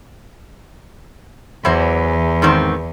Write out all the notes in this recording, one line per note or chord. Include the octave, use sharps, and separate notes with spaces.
E2 E3 F#3 C5
G#2 D#3 C4